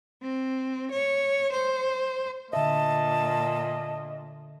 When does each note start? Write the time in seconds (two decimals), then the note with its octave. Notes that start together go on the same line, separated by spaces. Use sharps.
0.22 C4
0.92 C#5
1.53 C5
2.53 A#2 D3 D#5 E5 A5